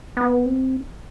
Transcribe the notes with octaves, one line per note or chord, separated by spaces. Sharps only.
B3
C4